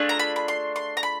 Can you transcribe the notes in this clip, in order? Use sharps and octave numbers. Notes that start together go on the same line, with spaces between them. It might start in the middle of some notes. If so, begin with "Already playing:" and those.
Already playing: A3 D4 F4 G#4
A#5
B5
B5
C6
C6
A#5
B5